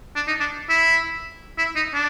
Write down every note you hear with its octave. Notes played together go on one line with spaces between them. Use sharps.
D4
D#4
D4
E4
E4
D#4
D4